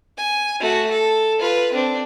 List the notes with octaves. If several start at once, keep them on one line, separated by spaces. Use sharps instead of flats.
G#5
A3 F#4
A4
F4 B4
C4 D4